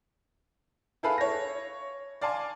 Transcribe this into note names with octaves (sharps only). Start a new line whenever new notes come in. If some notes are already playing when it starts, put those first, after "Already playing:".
E4 G#4 A4 B4 F5 B5
C#5 A#6
D5 F5 G#5 A5 C6